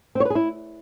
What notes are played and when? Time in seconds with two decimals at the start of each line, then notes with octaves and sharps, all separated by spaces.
0.15 C4
0.20 C#5
0.25 B4
0.30 G#4
0.35 E4